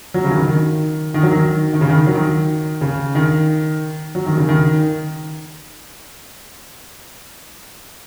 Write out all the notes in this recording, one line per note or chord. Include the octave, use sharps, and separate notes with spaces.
F#3
C#3
D#3
D#3
D#3
F#3
D#3
D#3
C#3
D#3
F#3
D#3
C#3
D#3
F#3
D#3
C#3
D#3